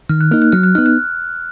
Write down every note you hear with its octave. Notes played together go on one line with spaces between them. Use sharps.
D#3 F6
F#6
A#3 D#4 F6
F#6
F#3 F6
F#6
B3 D#4 F6
F#6